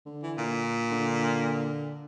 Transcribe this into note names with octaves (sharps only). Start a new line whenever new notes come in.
D3
E3
A#2
D3